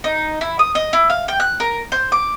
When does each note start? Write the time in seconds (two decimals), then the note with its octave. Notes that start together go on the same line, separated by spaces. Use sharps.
0.04 D#4
0.41 E4
0.59 D#6
0.75 D#5
0.93 E4
1.10 F5
1.28 G5
1.40 F#6
1.60 A#4
1.92 C5
2.12 D6